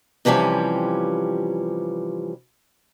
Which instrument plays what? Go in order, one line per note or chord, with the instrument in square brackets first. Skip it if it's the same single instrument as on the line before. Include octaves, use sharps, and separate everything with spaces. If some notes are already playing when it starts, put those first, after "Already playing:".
[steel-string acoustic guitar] C3 E3 F3 G3 C#4